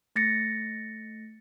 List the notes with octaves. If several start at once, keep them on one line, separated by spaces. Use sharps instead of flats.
A3 A6 A#6 C#7